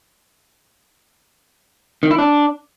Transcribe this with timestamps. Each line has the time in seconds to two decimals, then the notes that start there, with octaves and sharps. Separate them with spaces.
2.03 D#3
2.11 E4
2.18 D4